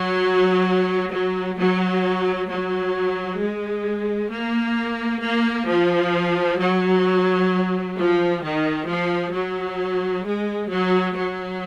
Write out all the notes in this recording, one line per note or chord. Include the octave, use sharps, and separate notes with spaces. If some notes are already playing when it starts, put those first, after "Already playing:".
Already playing: F#3
F#3
F#3
F#3
G#3
A#3
A#3
F3
F#3
F3
D#3
F3
F#3
G#3
F#3
F#3